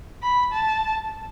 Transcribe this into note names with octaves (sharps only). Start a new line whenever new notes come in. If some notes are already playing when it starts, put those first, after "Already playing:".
B5
A5